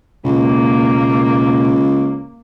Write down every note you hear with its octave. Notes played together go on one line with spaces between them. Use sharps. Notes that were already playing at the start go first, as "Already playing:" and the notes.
C#2 B2 A#3